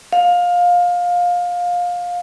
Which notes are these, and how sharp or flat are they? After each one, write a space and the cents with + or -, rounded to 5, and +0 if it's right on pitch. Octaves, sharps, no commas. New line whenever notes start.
F5 +20